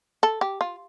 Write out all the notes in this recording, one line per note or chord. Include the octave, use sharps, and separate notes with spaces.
A4
G4
F4